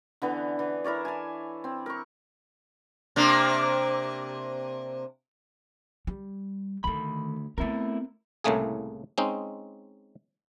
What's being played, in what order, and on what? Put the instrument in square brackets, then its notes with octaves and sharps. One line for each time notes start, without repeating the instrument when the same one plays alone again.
[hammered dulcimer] D3 E3 B3
E3
E4 A#4 C#5 D5
G#5 A5
C4
A#4 C#6
[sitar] C3 A#3 D4
[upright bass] G3
[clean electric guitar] D2 B5 [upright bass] D#3 A3
[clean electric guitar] A3 E4 A#4 [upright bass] B3 C4
[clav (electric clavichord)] C2 A2 C#3 A3 A#3 G#4
G#3 C4 C#4 D#4